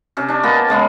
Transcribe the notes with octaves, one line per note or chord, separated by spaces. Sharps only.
C3 C#4
C#4 D4
A#3 B3 D#5 A5
C#3 G#3 A#3 B3